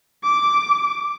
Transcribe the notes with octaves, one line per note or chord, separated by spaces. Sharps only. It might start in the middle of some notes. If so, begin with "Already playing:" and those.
D6